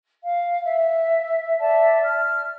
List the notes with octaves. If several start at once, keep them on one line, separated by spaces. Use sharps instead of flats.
F5
E5
D5 E5 A5
F6